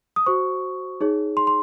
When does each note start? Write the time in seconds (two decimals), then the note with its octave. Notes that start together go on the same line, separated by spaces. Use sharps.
0.16 D#6
0.26 F#4 C5 C#6
1.01 D#4 G#4 C#5
1.37 C6
1.47 C6